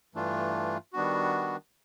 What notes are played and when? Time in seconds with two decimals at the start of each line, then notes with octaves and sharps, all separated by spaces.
0.15 G2 E3 A3 D4 F4
0.93 D#3 G3 B3 D4 F#4